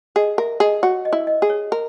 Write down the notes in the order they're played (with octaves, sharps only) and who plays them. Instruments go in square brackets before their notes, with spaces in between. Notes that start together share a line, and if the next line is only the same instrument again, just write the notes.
[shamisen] G#4 [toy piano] D#5
[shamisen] A#4 [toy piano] E5
[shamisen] G#4 [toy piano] D#5
[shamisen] F#4 [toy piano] C#5
[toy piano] D#5
[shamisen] E4
[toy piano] D#5
[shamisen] G#4
[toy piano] C#5
[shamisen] A#4